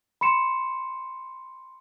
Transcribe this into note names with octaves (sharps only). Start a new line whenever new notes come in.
B5 C6 C#7 E7